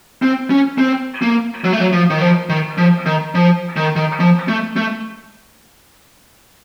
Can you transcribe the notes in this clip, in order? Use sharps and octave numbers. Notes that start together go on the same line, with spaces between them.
C4
C#4
C4
A#3
F#3
A3
F#3
F3
D#3
F3
D#3
F3
D#3
F3
D#3
D#3
F3
A3
A3